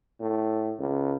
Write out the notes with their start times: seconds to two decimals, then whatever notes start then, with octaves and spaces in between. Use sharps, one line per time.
0.21 A2
0.79 C#2